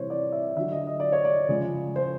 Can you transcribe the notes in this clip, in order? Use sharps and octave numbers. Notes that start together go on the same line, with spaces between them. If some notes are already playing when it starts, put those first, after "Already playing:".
Already playing: C3 E3 G3 C5 C#5
D5
E5
D3 F#3 E5
D#5
D#5
D5
C#5
D5
C#3 F3 G#3
C5